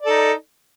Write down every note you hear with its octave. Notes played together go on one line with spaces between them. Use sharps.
D#4 A4 D5